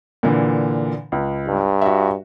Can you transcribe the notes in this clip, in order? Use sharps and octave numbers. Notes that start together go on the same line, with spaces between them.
A#2 D3 E3
C#2
G2
F#4 E5